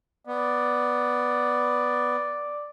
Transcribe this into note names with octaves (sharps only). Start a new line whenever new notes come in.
B3 D5